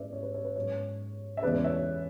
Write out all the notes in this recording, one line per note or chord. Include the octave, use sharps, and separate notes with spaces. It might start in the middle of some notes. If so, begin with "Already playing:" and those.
Already playing: G#2 G#3 C#4 B4 D5 E5
C#5
B4
C#5
B4
G#2 F#3 C#4 C#5
E5
E2 C#3 E3 G#3 B3 B4 D5
C#5 E5